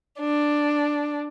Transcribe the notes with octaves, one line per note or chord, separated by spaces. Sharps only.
D4